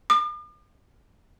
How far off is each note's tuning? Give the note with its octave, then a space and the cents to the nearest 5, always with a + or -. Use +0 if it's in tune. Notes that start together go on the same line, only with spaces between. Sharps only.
D6 +45